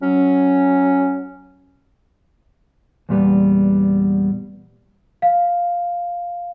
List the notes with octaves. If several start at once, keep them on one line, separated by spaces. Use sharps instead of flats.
F#3 C#4
E2 A#2 G3 B3
F5